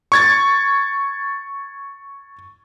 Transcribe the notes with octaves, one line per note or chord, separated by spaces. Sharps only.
C#6 G#6 A6